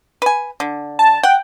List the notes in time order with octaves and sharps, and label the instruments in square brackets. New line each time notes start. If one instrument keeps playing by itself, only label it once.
[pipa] B4 G#5
D3
[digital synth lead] A5
[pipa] F#5 [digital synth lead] G5